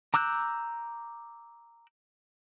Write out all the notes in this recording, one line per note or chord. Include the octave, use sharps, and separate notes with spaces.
A#5 D6 E6 F#6 G6